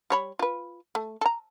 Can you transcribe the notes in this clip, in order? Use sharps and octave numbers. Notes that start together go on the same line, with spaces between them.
G3 C#5 B5
F4 B4
A3
A4 A#5